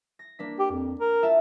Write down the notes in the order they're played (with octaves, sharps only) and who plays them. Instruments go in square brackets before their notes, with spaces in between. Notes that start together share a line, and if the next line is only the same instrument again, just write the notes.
[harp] A#6
A#3 D4 B6
[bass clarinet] G4
F2
A#4
[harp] F4 E5 A5